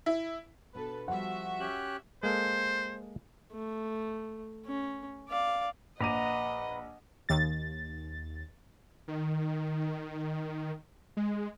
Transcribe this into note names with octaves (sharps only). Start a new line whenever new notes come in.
E4
B2 D4 A4 B4
F3 G3 F#4 E5 F#5
C#4 G4 F#6
G#3 A#3 A4 C5
A3
C#4
D5 F5
A#1 B4 D#5 F#5 A#5 D6 D#7
D#2 A6
D#3
G#3